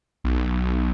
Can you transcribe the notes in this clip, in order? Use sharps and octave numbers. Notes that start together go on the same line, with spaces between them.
B1